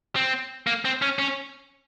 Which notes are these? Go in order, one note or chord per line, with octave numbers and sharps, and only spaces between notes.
C4
A#3
C4
C#4
C#4